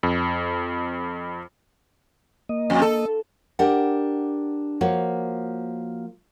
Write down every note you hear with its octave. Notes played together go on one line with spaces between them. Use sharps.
F2
A#3 D#5
F2
A4
D4 G4 A#4 F#5
F3 A#3 F#4 C#5